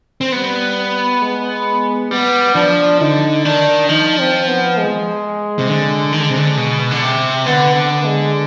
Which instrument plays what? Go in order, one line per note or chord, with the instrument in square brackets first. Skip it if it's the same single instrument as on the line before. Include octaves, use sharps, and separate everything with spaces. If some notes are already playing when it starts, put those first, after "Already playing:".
[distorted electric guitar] C4
[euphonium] G3 [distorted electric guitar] B3
[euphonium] G#3
[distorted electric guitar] G3 [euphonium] B3
[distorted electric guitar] F3 [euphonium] D4
[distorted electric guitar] D3 [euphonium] D#4
[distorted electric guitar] D#3 [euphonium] D4
[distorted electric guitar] F3 [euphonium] D#4
[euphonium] C4
B3
G#3
[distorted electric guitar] C3
D3
D#3
D3
C3
D3
B2
D3
C3
[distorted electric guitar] D3 [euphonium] B3
[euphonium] B3
G#3